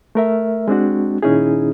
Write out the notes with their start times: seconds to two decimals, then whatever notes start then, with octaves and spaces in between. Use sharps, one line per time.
0.15 A3 A#4 E5
0.68 G#3 C4 D4 F#4
1.23 A#2 D#3 C#4 D#4 E4 G#4